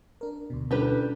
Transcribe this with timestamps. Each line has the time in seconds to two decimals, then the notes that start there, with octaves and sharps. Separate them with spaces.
0.21 D4 A#4
0.50 D2 B2
0.71 G3 C#4 D4 G4 A4 B4